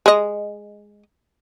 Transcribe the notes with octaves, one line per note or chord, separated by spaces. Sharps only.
G#3 D#5